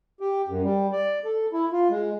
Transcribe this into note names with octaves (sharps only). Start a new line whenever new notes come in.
G4
F#2
G3
D5
A4
E4
F4
G#3